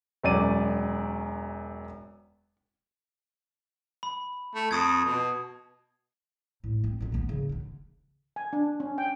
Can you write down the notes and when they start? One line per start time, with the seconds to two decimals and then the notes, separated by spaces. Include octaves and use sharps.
0.23 E1 F#2 D5 D#7
4.03 B5
4.55 A3
4.71 F2 A5 D#6 G#6
5.05 B2
6.64 A2
6.84 C4
7.01 A#2 C#4
7.12 D#3 B3
7.25 C#3 F3
7.49 D3 D#3
8.36 G#5
8.53 D4
8.80 C#4
8.98 G5